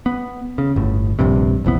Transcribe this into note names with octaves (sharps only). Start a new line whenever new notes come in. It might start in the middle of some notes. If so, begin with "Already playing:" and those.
B3
C#3
G1 A2
D#1 A#1 G2 C3
F1 A#1 E3 B3